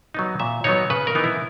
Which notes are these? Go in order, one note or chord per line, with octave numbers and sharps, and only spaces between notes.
F#3 B3 D#4
A#2 E5
F#3 B3 D#4 C#5
C#3 B4
A#4
E3 B3 D#4
E4